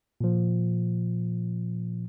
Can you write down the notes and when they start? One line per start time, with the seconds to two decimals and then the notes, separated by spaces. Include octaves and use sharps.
0.21 A#2 F3